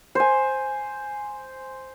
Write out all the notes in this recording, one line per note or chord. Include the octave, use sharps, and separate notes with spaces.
C5 G#5